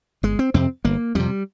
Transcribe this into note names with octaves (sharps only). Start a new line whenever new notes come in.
G1 G#3
C4
F2 C3 C4
G1 A#3
F2 C3 G3